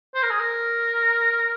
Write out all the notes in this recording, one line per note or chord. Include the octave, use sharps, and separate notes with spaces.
C5
A#4
G#4
A#4